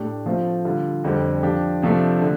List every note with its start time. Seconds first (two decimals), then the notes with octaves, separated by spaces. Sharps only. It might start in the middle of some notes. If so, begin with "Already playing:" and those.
Already playing: A2 A3 D4 G4
0.26 F3 A3 C4 F4
0.65 D3 G3 F4
1.04 F2 D3 G3 C4 G4
1.43 F3 D4 G4
1.82 C3 F3 A3 D4
2.22 D3